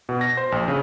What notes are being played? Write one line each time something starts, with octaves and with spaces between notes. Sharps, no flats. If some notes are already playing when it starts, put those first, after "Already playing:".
B2
A#6
C5
A#1
C#3